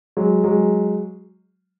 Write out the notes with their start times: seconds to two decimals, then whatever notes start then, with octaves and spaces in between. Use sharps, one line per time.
0.17 F#3 G#3
0.44 F#3 G#3